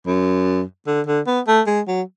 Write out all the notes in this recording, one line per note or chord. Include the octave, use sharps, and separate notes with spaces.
F#2
D3
D3
B3
A3
G#3
F#3